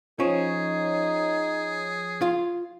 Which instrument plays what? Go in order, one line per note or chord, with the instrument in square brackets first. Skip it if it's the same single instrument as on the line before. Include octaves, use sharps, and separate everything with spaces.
[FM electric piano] F3 C#5 [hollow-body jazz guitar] C#4 [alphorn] D#4 [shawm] G#4
[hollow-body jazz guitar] F4